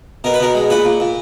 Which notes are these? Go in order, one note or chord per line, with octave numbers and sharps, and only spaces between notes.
B2 A#4
B4
B2 A#4
G#3
A#2 B4
A#2
A#2